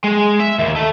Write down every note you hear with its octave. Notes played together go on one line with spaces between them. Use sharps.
G#3
E5
D#2
A3